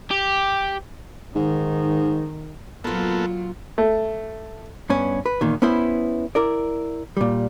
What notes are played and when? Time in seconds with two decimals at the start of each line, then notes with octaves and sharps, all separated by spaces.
0.11 G4
1.36 G#2 D#3
2.84 A#2 F#3 A#3 B3 F4 A4
3.78 A3
4.90 G2 B3 C#4
5.26 B4
5.41 E2 A#2 D#3
5.62 B3 C#4 E4 C5
6.35 E4 A#4 D5
7.17 A#2 G3